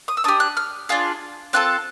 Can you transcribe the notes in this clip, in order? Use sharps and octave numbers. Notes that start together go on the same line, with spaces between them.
D#6
E6
D4 G4 D#6
F#6
F6
D4 F4 G#4
C4 F4 A4 F#6